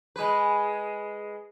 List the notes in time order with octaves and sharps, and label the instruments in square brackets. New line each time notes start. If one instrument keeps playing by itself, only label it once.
[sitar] G#3 B4